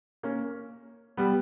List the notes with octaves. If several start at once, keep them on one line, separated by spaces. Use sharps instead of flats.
A#3 C#4
G3 B3